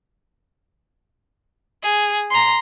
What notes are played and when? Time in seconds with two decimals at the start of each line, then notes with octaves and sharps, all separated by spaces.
1.83 G#4
2.31 A#5 C6